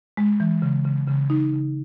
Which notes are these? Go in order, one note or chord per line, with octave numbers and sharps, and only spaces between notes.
G#3
E3
C#3
C#3
C#3
D#4
C#3